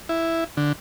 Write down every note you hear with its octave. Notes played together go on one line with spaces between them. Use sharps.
E4
D3